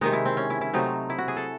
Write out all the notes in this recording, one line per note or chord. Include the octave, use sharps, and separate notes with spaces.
C3 D#3 G#3 D#4
E4
C4
C#4
E4
E4
C3 F#3 A3 C4 D#4
E4
F#4
G#4
A4